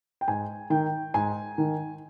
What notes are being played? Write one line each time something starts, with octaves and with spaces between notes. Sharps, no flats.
G5
G#2 G#5
D#3 G5
G#2 G#5
D#3